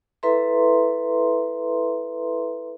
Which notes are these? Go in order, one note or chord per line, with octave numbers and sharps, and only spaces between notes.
E4 A4 B4 E5 A#5 C6